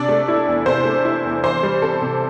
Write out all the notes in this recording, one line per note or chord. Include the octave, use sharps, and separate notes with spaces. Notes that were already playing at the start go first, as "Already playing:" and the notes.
Already playing: C3 D4 D5
A3
E4
E2
C3 C5
A3
E4
E2
E3 C5
G3
C4 A4
C3